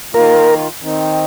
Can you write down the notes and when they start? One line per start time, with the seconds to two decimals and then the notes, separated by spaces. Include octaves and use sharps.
0.13 D#3 A#3 F4 A#4
0.81 D#3 C4 D#4